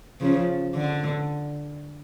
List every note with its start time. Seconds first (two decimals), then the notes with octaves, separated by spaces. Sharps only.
0.21 C#3 F3
0.75 D3